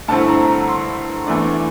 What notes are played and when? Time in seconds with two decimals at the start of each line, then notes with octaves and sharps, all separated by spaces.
0.08 G2 D3 A3 C4 E4 A5
0.28 A#5
0.48 A#5
0.68 C6
1.27 E2 E3 A3 D4